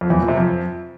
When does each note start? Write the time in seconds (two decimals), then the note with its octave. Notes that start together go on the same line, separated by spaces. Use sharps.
0.01 F2
0.10 E2
0.19 A#2
0.28 C3
0.37 F2